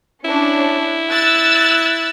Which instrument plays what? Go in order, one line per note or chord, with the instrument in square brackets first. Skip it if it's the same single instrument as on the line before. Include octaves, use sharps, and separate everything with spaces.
[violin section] C#4 D4 [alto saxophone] E4
[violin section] E6 F#6 A6